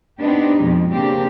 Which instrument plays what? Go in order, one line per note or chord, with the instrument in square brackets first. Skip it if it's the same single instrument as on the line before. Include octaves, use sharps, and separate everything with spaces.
[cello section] B3 C4 D4 D#4 G4
F2 B2 G#3
C#3 A#3 C4 D4 G4